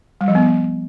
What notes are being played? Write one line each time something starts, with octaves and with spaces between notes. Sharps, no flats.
G3
F3
B3